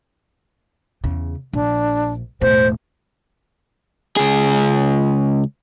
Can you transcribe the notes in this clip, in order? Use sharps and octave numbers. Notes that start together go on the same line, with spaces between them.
E2 C#3
A#1 D4
E1 A2 C5
C#2 G#4